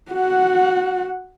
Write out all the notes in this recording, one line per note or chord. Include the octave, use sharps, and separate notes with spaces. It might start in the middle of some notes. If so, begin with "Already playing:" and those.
F#4 F#5